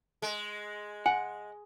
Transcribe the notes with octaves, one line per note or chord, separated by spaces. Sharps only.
G#3
F#5 G#5